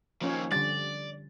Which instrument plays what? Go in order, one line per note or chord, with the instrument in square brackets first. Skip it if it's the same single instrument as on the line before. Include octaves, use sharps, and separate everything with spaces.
[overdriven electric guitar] D#2 A#2 [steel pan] F3 C#4 C#5
[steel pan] D3 G3 [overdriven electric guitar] D5 [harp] A6